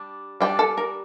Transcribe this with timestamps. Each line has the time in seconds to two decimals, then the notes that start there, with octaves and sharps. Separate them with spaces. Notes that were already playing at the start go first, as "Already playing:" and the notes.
Already playing: G3 D4
0.41 G3 D4 G5
0.59 A4
0.77 A#4